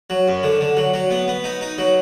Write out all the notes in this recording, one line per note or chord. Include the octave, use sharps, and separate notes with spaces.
F#3
F#2
D3
D3
F#3
F#3
B3
B3
D#4
D#4
F#3